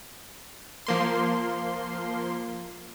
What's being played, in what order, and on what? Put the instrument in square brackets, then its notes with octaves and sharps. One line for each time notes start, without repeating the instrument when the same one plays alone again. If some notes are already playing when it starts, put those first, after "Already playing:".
[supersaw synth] F3 A#3 C6